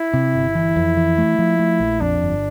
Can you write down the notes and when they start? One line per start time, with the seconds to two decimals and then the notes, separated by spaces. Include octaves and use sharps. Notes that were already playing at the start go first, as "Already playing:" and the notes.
Already playing: E4
0.13 C3
0.35 G1
0.55 E3
0.76 F2
0.97 E3
1.18 A3
1.39 F3
1.59 A3
1.80 A#1
2.01 F2 D4
2.22 G1